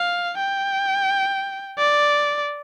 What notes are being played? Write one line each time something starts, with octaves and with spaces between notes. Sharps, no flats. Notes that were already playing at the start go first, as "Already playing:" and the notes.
Already playing: F5
G5
D5